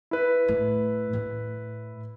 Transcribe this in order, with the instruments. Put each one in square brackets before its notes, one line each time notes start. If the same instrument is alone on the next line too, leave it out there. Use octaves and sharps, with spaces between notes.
[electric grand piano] E4 B4
[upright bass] A2
A2